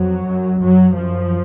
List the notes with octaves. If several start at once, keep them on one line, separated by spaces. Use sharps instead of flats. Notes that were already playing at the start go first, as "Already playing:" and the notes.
Already playing: F2 F#3
F#2
F#2 F#3
F#2 F3